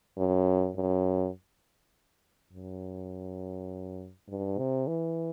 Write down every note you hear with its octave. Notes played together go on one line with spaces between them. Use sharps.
F#2
F#2
F#2
G2
C3
E3